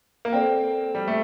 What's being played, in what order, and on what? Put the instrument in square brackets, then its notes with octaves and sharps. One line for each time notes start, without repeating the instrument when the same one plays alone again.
[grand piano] A#3
[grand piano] C4 [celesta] A4 D5 G5
[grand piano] G3
A3